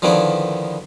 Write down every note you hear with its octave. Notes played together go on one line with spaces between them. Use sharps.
D3 D#3 F3 B3 E4 D5